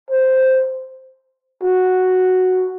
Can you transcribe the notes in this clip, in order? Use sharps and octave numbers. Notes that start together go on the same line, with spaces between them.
C5
F#4